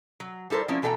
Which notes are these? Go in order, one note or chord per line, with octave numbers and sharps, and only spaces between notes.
F#3
G3 E4 A4 A#4 C5
F3 A#3 C4 C#4 E4
B2 E3 A4 E5 G5 A#5